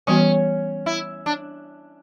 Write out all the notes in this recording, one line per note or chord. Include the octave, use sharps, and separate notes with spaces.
E3 G3 B3 C#4 F#4
E4
D4